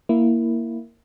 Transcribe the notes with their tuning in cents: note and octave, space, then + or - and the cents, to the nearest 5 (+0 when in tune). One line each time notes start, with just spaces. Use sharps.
A#3 +0 E4 +0